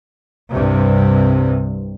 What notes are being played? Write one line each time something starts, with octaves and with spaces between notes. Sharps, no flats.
C2 G2 C3